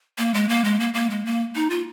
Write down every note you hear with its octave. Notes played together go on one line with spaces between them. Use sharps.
A#3
G#3
A#3
G#3
A#3
A#3
G#3
A#3
D#4
F4